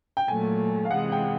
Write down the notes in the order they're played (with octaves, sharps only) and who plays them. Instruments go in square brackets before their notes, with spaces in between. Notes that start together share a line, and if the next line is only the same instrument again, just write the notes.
[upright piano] G5
[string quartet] A#2 F#3 A3 [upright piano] G#5
[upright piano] F5
[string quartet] C3 E3 G#3 [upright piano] F#5
[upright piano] G5